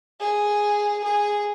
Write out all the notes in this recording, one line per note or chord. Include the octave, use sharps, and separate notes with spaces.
G#4
G#4